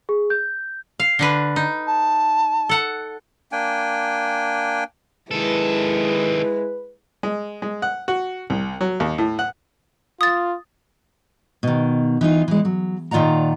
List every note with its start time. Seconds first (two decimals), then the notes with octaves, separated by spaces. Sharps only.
0.09 G#4
0.30 G6
1.00 F5
1.19 D3 D4 B4
1.56 D#4
1.87 A5
2.69 A4 F#5
3.52 A#3 D4 G5 G#5
5.31 D#3 G#3 E4 A4 B4
7.23 G#3
7.62 G#3
7.82 F#5
8.08 F#4
8.50 C2
8.81 F#3
9.00 D#2
9.18 A2
9.39 F#5
10.21 F4 D#6 A6
11.63 B2 D#3
12.21 E3 D#4 F4
12.48 E3 G#3
12.65 F#3
13.11 A#2 D#3 F4 D5 F#5 A#5